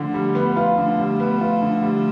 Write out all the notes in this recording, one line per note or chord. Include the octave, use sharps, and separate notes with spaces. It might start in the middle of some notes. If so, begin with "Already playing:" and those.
Already playing: D3 F3 A3
G3
B3
F4
D3 F3 A3
G3
B3
F4
D3
G3